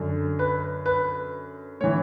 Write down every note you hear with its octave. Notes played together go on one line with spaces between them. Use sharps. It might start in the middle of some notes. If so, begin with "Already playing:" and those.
Already playing: F#2 D3
B4
B4
A2 E3 C#5